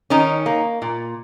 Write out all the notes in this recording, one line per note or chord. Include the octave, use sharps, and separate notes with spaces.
D#3 C#4 D#4
A#3
A#2